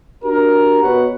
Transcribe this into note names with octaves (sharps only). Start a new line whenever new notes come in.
D4 F#4 G4 A#4
B2 B3 F#4 B4 C#5 F#5